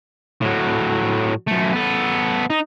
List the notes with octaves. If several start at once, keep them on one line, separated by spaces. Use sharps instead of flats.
A2 F#3
F#2 A3
B3 A4
D#4